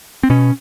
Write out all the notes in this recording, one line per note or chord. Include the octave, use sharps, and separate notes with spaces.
C4
B2 C#4